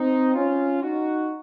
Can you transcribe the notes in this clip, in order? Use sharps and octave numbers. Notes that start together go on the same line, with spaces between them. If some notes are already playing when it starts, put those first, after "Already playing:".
Already playing: C4 D#4
C#4 F4
D#4 F#4